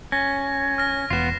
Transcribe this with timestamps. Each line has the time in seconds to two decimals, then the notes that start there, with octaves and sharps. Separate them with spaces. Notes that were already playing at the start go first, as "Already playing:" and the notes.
0.12 C#4 A#6
0.78 F6 A#6
1.10 E1 B3 F4 C7 E7